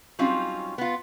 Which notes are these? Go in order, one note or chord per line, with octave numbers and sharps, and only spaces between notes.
F#3 G3 C4 C#4 D#4 F4
B3 F4